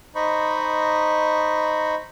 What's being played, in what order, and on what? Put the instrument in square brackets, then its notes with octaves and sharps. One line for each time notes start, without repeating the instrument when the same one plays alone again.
[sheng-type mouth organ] D#4 C5 D#5 B5 C#6